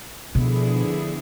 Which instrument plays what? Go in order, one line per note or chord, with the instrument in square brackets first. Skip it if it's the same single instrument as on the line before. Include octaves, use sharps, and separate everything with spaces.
[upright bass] B2 [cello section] D3 F3 B3 E4 G#4